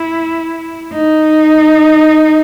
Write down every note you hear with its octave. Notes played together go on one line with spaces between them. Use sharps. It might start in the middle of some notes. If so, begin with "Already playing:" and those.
Already playing: E4
D#4